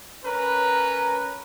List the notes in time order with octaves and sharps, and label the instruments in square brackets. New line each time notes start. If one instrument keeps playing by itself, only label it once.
[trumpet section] C#4 A#4 B4 A#5